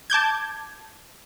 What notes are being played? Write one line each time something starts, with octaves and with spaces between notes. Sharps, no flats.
A5 D6 G6 G#6